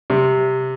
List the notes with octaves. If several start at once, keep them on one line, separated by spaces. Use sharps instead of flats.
C3